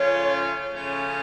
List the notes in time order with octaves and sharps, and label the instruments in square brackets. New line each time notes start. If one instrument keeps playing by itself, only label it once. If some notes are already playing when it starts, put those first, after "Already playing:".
Already playing: [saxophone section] C#3 F3 A3 C#4 F4 [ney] C#5
[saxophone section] C#3 F3 A3 C#4 F4